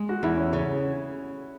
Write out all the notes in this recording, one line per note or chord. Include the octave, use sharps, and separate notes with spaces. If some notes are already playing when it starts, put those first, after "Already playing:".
Already playing: G#3 G#4
F#4
E2 E4
C#4
C#3 C#4